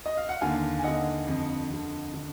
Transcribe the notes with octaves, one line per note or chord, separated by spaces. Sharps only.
D#5
F5
F#5
D#2 D3 F5 G#5
G#5
D#2 D3 D#5 F#5
F2 D3
F2 D3
D3